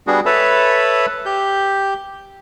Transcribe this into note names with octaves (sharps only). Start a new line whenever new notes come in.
G3 B3 D4 F#4 G#4
A4 B4 C#5 E5 A5 B5
G4 G6